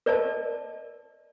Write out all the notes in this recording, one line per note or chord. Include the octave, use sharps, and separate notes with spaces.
A#4 D5 D#5 A5